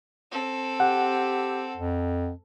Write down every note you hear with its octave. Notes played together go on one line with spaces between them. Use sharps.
C4 A4
G4 F#5
F2